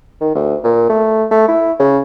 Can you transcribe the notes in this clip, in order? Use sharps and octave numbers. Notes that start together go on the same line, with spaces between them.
D#3
D2
A#2
A3
A3
E4
C#3